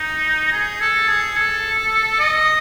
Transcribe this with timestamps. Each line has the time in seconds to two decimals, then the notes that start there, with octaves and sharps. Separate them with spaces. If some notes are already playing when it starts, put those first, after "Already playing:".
Already playing: D#4
0.52 G#4
0.81 A4
1.09 G#4
1.37 A4
2.20 D#5